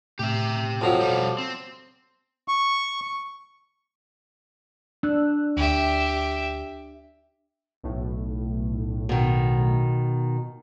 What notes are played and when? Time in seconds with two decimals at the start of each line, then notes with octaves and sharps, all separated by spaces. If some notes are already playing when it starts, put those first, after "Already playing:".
0.19 A2 C3 A3 G4 E5
0.81 F2 F3 F#3 A5 D#6 A6
1.00 B1 G3
1.38 C4
2.48 C#6
5.03 D4 E6 F#6
5.57 D2 G4 E5
7.83 B1 A2
9.09 B2 D#3